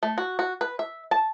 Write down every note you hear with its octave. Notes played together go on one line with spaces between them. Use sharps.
A3
F#4
F#4
B4
E5
A5